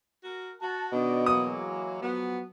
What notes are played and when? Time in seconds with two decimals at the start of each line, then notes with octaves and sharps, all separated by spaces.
0.24 F#4 A#4
0.62 F#4 A5
0.92 B2 D#3 D4 D5 D#5
1.26 E3 F#3 G#3 A#3 D#6
2.02 F3 F#3 B3